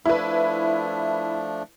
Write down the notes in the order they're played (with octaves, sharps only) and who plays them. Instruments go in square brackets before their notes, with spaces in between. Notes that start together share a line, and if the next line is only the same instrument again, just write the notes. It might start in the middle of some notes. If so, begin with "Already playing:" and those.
[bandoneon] F3 A3 D4 [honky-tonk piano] E4 B4